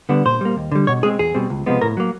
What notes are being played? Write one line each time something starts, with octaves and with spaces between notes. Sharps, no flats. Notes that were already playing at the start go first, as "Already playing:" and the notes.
D3 G3 B3 D4
A#2 C5
G3 A#3
D#2
D3 G3
B2 C#5
G#3 C4 G#4
E2 G#4
B2 G3 C4
C#2
C3 F3 G#3 B3
A2 A#4
F#3 A#3